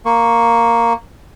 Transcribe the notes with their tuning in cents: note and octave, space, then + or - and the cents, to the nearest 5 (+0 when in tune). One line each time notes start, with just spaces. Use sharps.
A#3 +0 C#6 +0